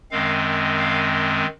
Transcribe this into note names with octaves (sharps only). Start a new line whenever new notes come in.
F#2 D#3 G#3 C4 F5
F5